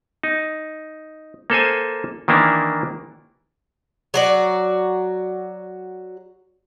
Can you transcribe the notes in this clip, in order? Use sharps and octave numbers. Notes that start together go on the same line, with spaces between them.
D#4
A#3 A4 C5 G#5
D#3 E3 A#3 D4 E4
F#3 F#4 D5